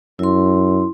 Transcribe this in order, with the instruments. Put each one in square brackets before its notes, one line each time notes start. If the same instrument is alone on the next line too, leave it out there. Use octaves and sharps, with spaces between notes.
[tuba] F#2 [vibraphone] E4 C6